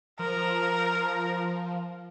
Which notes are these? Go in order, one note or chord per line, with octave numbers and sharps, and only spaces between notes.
F3 A#4